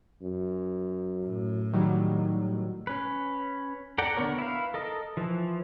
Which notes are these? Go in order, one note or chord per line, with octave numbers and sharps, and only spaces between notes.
F#2
A2
D#3 F#3 G3
C#4 B4
A4 D5 F#5 G5 A#5
D3 B3 C4 A#4 C#5
E4 B4 F5
A4 A#4 D#5
E3 F3